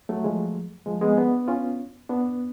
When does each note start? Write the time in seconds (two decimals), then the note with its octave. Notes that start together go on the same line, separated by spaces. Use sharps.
0.09 F#3 A3
0.24 F3 G#3
0.86 F3 G#3
1.01 G#3 B3
1.18 B3 D4
1.48 C#4 F4
2.09 B3 D4